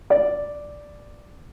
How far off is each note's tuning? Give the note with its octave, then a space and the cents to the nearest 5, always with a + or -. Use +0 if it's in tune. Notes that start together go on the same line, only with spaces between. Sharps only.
D5 +0